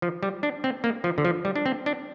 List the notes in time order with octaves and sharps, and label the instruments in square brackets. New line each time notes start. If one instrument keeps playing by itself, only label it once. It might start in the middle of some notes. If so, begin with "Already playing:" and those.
[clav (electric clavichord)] F3
G3
D4
C4
A#3
F3
D3
F3
G3
D4
C4
D4